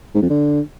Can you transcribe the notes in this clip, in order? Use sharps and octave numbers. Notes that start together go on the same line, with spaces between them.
G#2
F2
D3